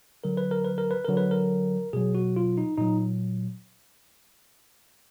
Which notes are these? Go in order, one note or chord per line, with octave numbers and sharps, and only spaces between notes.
D3 F#3 A#4
B4
A#4
B4
A#4
B4
D3 F#3 A#4
B4
A#4
B2 F#3 G#4
F#4
F4
D#4
A#2 F#3 D#4